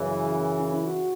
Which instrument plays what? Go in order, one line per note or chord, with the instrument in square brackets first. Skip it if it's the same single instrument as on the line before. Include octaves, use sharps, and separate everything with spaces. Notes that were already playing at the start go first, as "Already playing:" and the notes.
Already playing: [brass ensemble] F#2 C#3 E3
[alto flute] F#4
C#4
E4
F#4